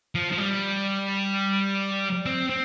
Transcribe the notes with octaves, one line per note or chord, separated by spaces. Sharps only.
F3
F3
G3
C4
C4